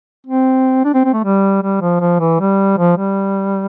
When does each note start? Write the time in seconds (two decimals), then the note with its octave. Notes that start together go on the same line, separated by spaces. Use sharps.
0.27 C4
0.85 D4
0.94 C4
1.04 C4
1.13 A3
1.24 G3
1.62 G3
1.81 F3
2.00 F3
2.20 E3
2.40 G3
2.78 F3
2.97 G3